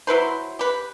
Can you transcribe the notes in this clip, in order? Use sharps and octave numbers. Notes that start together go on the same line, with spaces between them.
F#3 E4 B4 C5
G4 B4